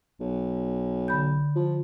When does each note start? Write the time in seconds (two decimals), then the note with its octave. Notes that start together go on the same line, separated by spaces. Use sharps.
0.20 B1
1.08 D3 B5 G6
1.56 F3